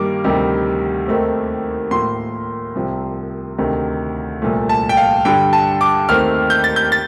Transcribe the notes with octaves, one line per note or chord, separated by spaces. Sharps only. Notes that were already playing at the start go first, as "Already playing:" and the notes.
Already playing: G2 D#3 G3 A#3 D6
D2 C3 D#3 G3
D#2 D#3 A3 C4
A2 F3 A#3 C6
C2 C3 F3
D2 C3 D#3
C2 A#2 F3 A3
A5
G5
F5
G2 D3 G3 G5
A5
D6
D#2 D#3 A3 C4 F6
G6
A6
G6
A6